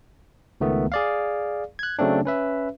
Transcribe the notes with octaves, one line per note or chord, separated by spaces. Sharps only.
C#2 D#3 A3 B3
G#4 D5 F5
F#6 G#6
C#3 F#3 A3 C4 D4
C#4 B4 E5